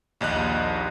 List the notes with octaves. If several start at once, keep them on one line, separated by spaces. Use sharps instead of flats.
A#1 D#2 D#5 F#6